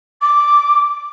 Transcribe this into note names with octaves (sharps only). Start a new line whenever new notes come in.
D6